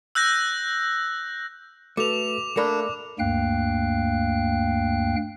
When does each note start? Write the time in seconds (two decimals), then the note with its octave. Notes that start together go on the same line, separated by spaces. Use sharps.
0.15 E6 F#6 G6 A#6
1.97 A3 F#4 A4 B4 D6 F7
2.57 A3 A#3 D4 A#4 D5 B5
3.19 D2 G2 A#3 F5 G5 F#6